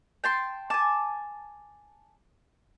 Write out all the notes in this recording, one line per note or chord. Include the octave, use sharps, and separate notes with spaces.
G5 A5 C6
G#5 A5 D6